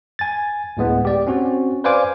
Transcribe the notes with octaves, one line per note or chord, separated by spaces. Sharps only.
G#5 A6
D2 A2 G#3 B3
G4 D5
C4 C#4 F#4
B4 C5 D5 F5 G#5 D6